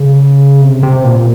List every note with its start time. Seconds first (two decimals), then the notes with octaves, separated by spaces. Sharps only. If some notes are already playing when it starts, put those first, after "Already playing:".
Already playing: C#3
0.62 C3
0.83 C3
1.04 A#2